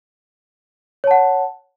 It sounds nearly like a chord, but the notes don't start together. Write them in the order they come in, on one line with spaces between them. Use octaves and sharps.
C#5 A5 F#5